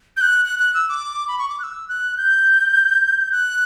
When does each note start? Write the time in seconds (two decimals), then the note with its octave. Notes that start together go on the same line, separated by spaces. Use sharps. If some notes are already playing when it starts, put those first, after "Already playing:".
0.17 G6
0.21 F#6
0.45 F#6
0.59 F#6
0.74 E6
0.89 D6
1.28 B5
1.39 C#6
1.49 D6
1.59 F#6
1.63 E6
1.88 F#6
2.17 G6
3.32 F#6